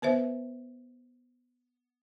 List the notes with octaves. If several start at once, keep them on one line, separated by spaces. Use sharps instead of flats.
B3 B4 C5 E5